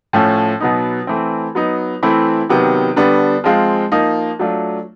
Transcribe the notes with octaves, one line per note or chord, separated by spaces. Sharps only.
A2 F3 A3 C#4
B2 F#3 B3 D#4
E3 A3 C4
F#3 B3 D#4
E3 A3 C4 E4
C3 D#3 F#3 B3
D3 G3 B3 D4
F3 G#3 C4 F4
F3 A#3 D#4
F#3 A3 D4 F4